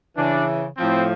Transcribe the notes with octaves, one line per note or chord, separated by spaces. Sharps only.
C#3 E3 D4
A2 F3 C4